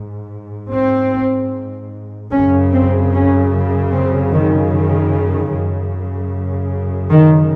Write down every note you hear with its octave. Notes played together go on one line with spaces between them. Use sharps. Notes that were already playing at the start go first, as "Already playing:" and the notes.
Already playing: G#2
C4
F#2 C#3 C#4
C4
C#4
C4
D#3
D#3
F#2 C#3
D#3